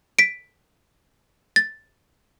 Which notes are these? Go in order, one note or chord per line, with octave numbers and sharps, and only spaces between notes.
B6 D7
A6